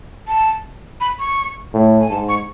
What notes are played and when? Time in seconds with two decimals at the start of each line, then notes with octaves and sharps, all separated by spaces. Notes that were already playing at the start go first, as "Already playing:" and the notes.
0.28 A5
1.01 B5
1.19 C#6
1.74 A2
2.01 G#5
2.10 G#2 A5
2.29 C#6